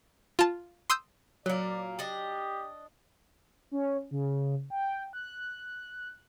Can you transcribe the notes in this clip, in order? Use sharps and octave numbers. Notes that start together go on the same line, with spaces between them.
F4 A5
C6 D#6 E6 G6
A#2 F#3 A#3 D5
D4 G4 D#5
C#4
C#3
G5
F#6